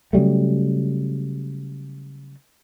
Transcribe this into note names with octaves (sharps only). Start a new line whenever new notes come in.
C#3 F#3 G3 A3